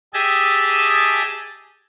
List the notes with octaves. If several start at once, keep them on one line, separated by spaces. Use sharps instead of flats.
G4 G#4 D#5 E5 G#5 A5